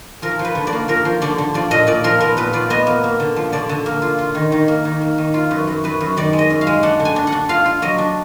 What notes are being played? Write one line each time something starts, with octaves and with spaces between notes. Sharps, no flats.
F3 A#4
F3
B4
D3
D5
A#3
F3 A#4
F3
D3 D5
D3
F3 D5
A#2 D#5
A#2 D5
F3 A#4
B3 A#4
A#2 B4
F4 D5
B3 D#5
A#3
A#3
D3
F3
D3 D5
D3
A#3
F4
F4
D#3
D#3
A#3
D#3
A#3
D#3
F4
F#2 B4
F#2
F#2 B4
F#2
D#3 D5
G#3
D#5
F#2
F5
G#3
D4 F#5
D3
G#5
D4
F#5
D4
F4 F5
F4
F#3 D#5
D4